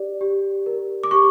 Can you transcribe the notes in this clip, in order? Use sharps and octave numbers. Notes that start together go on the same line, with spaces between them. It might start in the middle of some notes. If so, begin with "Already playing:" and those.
Already playing: G4 D5
G4
A#4
D6
G4 C#6